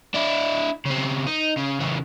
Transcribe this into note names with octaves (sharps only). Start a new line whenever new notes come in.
D4 E4
C#3 C4
D#4
C#3
C#3 E3